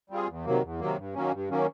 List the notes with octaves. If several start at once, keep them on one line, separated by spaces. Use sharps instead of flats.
G3 C4 F4 G#4
E2
C3 D#3 F#3 A#3
E2
C3 D#3 F#3 A#3
G2
D#3 F#3 A#3 C#4
G2
D#3 F#3 A#3 C#4